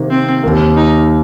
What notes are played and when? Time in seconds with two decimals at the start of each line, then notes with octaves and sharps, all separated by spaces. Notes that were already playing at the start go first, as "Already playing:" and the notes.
Already playing: C3 D#3 A#3
0.10 C4
0.43 D#2 D#3 A#3
0.76 D#4